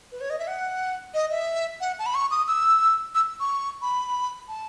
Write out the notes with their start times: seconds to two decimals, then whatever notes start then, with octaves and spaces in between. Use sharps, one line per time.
0.12 B4
0.21 C#5
0.30 D#5
0.39 E5
0.47 F#5
1.14 D#5
1.31 E5
1.81 F#5
1.99 A5
2.06 B5
2.15 C#6
2.31 D#6
2.48 E6
3.15 E6
3.40 C#6
3.82 B5
4.48 A5